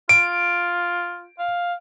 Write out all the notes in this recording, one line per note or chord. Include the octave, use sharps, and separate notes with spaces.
F4 D7
F5